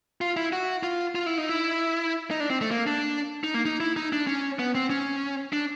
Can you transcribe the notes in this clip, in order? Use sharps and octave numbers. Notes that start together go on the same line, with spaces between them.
F4
E4
F#4
F4
F4
E4
D#4
E4
D#4
D4
C4
A3
A#3
D4
D#4
A#3
D#4
E4
D#4
D4
C#4
B3
C4
C#4
D4